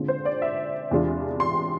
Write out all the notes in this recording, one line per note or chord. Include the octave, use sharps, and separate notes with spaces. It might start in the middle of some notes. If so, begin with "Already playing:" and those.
Already playing: D3 G#3 C4 F4
C5
D5
E5
E2 C3 G#3 D4 F4
C6